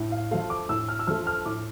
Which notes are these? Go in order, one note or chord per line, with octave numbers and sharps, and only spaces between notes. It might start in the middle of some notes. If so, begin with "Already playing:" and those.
Already playing: A2
F5
F3 A3 F5
D6
A2 E6
F6
E6
F3 A3 F6
F6
A2 D6